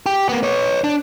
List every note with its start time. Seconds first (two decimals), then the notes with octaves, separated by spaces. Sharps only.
0.06 G4
0.29 A#3 B3
0.43 B4 C#5
0.84 D4